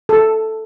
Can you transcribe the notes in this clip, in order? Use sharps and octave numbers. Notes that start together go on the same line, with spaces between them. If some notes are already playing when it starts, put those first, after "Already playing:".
A4